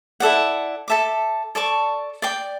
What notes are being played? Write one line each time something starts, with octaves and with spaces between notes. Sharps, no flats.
E4 A4 D5 F#5
A4 E5 A5 D6
A4 D5 A5 C#6
D5 G5 D6